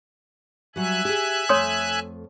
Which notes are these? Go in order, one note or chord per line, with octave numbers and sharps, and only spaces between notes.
F#3 G3 E5 G#5 F#6
G4 G#4
F2 A3 C#5 C6 D#6